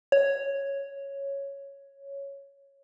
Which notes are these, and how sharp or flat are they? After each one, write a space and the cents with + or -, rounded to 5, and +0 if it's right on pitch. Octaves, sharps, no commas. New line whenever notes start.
C#5 +0